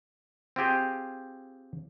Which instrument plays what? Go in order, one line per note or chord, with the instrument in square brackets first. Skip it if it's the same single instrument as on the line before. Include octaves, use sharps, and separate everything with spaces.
[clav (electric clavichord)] C4 F4 G4 G#4